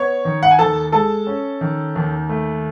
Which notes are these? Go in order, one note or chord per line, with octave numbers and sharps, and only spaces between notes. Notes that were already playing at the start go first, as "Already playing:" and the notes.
Already playing: B3 C#5 C#6
D#3
F#5
G#5
D#2 A4 A5
G#3 A4 A5
C#4
D#3
D#2
A3